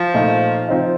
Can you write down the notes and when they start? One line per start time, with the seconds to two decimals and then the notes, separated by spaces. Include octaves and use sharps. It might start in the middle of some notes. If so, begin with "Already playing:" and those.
Already playing: F3
0.14 A#2 A3 D#4
0.68 F3 C4 D#4